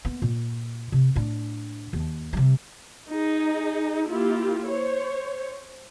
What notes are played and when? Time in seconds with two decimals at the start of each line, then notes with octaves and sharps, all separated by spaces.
0.05 A#3 B3
0.22 A#2
0.92 C3
1.16 A2 D4
1.93 D#2
2.33 C3 G3
3.09 D#4 G#4
4.09 A#3 E4 F4 G4
4.67 C5 C#5